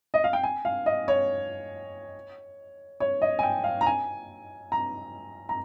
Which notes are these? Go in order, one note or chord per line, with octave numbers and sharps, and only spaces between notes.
D#5
F5
G5
G#5
F5
D#5
C#5
C#5
D#5
G#5
G5
F5
A#5
G#5
A#5
A#5